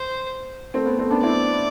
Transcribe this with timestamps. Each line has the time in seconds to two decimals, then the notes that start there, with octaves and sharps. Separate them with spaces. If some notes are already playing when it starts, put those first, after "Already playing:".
Already playing: C5
0.74 A3 C4
0.86 B3
0.99 A3 C4
1.11 B3 D4
1.22 C4 E4 D5